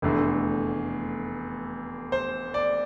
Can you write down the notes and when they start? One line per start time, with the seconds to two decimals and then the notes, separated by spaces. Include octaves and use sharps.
0.02 F1 E2 D3 A3
2.12 C5
2.54 D5